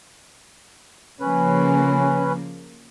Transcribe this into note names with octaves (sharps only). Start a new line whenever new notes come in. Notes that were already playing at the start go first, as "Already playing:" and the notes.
C#3 F3 A#3 C#4 B4